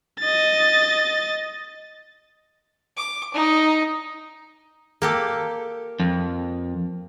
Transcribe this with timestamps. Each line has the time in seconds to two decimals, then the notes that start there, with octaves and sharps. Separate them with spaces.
0.20 D#5 A6
2.97 D6
3.34 D#4
5.02 A#3 G4 A4
6.00 F2